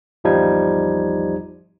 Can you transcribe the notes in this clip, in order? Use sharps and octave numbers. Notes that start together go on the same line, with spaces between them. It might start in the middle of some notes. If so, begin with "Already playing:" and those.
G#1 E2 F3 G3 D#4 G#6